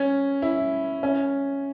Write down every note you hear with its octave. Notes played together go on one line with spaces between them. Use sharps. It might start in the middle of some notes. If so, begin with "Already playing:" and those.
Already playing: C#4
E4
C#4